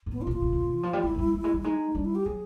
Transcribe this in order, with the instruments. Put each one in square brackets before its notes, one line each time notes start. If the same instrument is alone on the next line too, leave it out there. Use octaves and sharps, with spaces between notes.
[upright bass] G#2
[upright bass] A2 [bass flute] B3
[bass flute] F4
[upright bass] A#2
[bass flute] F4
[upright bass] B2
A#2
A#2
E3
F3
G3
[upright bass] G#3 [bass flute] E4
[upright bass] G#3
G3
G3
G#3
G3
[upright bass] G#3 [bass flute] D#4
[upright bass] G3 [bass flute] D4
[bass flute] E4
G4
[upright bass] F#3 [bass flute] G#4